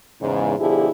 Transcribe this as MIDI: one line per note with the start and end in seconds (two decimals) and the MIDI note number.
0.21 0.53 40
0.21 0.53 44
0.21 0.53 49
0.59 0.88 47
0.59 0.88 50
0.59 0.88 53
0.59 0.88 64
0.59 0.88 67
0.59 0.88 68